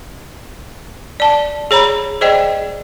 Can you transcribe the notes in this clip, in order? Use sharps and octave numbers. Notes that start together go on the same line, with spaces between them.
D5 A5
G#4 C#5 A#5 B5
G#4 C5 D5 D#5 G5